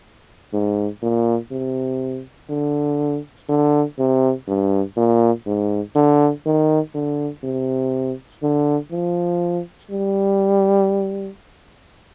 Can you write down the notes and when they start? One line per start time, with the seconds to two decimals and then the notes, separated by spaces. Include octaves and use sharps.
0.53 G#2
1.02 A#2
1.52 C3
2.50 D3
3.49 D3
3.99 C3
4.47 G2
4.97 A#2
5.47 G#2
5.95 D3
6.46 D#3
6.95 D3
7.44 C3
8.43 D3
8.92 F3
9.91 G3